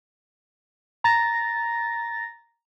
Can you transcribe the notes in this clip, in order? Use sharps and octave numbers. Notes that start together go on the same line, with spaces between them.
A#5 A6 A#6